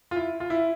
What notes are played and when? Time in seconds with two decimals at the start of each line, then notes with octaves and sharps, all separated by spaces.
0.11 F4
0.16 E4
0.40 F4
0.50 E4